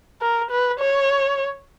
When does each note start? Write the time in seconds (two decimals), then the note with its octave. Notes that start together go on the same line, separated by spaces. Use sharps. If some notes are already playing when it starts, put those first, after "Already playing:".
0.21 A#4
0.50 B4
0.80 C#5